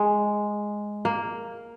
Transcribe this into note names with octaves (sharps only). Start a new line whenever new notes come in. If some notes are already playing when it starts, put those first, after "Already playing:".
Already playing: G#3
A#3